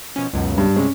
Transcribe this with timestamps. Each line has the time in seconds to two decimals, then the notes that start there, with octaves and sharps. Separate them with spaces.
0.16 B2 F3 C#4
0.33 C#2 F#2 B2
0.58 G2
0.76 C3 G#3 C#4